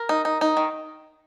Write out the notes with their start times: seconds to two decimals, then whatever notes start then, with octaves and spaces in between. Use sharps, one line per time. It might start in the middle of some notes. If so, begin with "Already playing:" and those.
Already playing: A#4
0.09 D#4
0.25 D#4
0.41 D#4
0.57 D#3